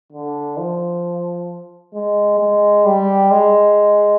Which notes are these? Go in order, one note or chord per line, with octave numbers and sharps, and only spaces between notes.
D3
F3
G#3
G#3
G3
G#3